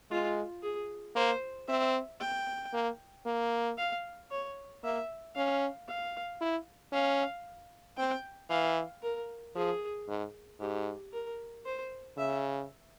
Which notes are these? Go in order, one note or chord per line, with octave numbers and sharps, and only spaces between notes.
G#3 F4
G#4
A#3 C5
C4 E5
G5
A#3
A#3
F5
C#5
A#3 E5
C#4 F5
F5
E4
C#4 F5
C4 G5
E3 F5
A#4
F3 G#4
G#2
G#2 G4
A#4
C5
C#3 E5